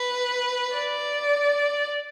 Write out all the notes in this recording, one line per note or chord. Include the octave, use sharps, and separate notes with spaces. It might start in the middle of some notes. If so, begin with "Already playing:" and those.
Already playing: B4
D5